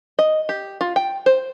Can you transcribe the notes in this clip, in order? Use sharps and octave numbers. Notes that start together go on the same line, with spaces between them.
D#5
G4
F4
G5
C5